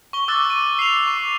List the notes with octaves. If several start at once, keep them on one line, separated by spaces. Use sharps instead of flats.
C#6 G7
D6 E6 F#6 A6
D#7
C7 F7
C#6